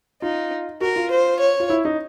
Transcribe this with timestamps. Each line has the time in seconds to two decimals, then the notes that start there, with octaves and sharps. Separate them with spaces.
0.22 D#4 F4
0.81 F#4 A#4
0.96 F4
1.11 C5
1.40 C#5
1.60 F4
1.70 E4
1.85 D#4